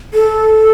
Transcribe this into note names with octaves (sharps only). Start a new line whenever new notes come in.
A4